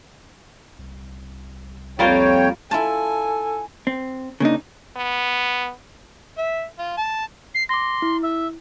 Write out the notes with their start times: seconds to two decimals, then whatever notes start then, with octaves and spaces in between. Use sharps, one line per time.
0.79 C2
1.99 F2 G3 A#3 F4 C#5 G5
2.71 E4 F4 A4 G#5 A5
3.87 C4
4.40 C#3 A#3 D4 D#4
4.96 B3
6.37 E5
6.79 F4
6.97 A5
7.55 C7
7.69 C6 D6 A#6
8.02 E4
8.22 E5